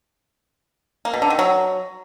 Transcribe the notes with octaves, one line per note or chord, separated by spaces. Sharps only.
A#3
B2
D3
D#3
F#3